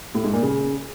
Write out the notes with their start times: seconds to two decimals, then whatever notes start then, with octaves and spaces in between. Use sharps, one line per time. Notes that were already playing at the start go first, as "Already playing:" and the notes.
0.15 A2
0.24 G#2
0.33 A#2
0.43 C#3